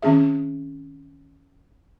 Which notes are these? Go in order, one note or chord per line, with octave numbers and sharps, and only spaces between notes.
D#3 C4 C#4 G#4 E5